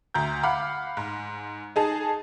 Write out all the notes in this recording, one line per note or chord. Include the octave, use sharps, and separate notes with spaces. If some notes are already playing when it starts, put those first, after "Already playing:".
D2 A#5 G6
F5 F#5 B5 D6 F6
G#2
D#4 G#4 A5